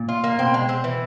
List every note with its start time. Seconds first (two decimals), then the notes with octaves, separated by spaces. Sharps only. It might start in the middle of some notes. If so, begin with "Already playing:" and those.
Already playing: A#2
0.09 F4
0.24 A#3
0.39 B2 C4
0.54 G#3
0.69 C4
0.84 E3